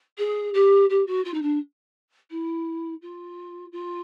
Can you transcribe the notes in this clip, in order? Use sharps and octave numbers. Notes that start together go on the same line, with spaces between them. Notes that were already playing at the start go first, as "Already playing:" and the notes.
G#4
G4
G4
F#4
F4
D#4
D4
E4
F4
F4